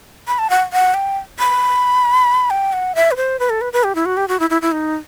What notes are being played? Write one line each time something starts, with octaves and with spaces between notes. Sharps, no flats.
B5
A5
F#5
F#5
G5
B5
G5
F#5
E5
B4
C5
B4
A4
B4
B4
G4
E4
F#4
G4
F#4
E4
E4
E4
D#4